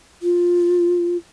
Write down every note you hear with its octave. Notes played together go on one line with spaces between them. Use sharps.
F4